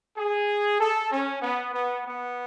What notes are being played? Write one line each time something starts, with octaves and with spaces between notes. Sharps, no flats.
G#4
A4
C#4
B3
B3
B3